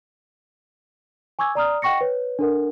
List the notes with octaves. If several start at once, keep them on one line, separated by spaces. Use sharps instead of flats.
G#5 C#6 D6 E6 G#6
D5 A#5 D#6 F6
D#5 F#5 G5 C#6 A#6 C#7
B4 C#5
D4 A4 A#4 F#5